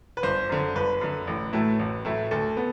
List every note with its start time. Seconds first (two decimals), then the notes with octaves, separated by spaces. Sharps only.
0.17 B4
0.23 G1 C5
0.49 F#2 D3
0.75 G1 B4
1.01 F#2 D3
1.27 A1
1.53 A2 F#3 A3 E4
1.79 A1
2.05 A2 F#3 A3 E4
2.31 D2 A4
2.57 B3